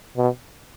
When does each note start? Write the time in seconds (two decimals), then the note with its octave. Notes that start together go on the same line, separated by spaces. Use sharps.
0.17 B2